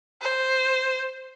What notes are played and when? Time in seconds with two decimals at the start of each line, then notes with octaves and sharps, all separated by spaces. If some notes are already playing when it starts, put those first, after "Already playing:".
0.22 C5